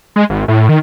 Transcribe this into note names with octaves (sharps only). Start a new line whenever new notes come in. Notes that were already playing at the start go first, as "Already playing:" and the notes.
G#3
G#1
A2
D#3